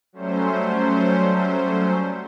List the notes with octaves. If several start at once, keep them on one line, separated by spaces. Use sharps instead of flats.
F#3 G3 A3 C#4 C5